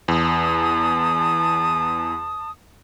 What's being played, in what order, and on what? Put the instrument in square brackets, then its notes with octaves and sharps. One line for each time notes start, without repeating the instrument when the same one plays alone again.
[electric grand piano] E2 [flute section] A5 D#6